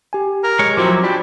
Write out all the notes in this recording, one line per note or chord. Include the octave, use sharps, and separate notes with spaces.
G4 G#5
A#4
G#3 C#5
F3 F#3 C4 E4 F#4 D6
D4 F4 G4 D5 B5